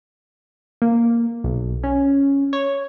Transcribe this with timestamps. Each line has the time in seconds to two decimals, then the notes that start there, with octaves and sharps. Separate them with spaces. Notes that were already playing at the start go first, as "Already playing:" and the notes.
0.82 A#3
1.44 B1
1.84 C#4
2.53 C#5